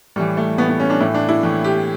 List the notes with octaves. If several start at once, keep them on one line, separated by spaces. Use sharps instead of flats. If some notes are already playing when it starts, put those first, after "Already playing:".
A2 E3 G3
A3
A2 E3 B3
B3
C#4
D4
A2 E3 E4
D4
E4
A2 E3
G4